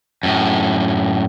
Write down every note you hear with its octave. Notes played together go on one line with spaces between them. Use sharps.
F#2 A2